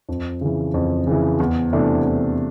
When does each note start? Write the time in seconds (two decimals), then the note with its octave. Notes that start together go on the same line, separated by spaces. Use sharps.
0.08 F2
0.41 C#3 E3
0.74 F2
1.07 C#3 E3
1.40 E2
1.73 C3 E3 A3 D4
2.05 E2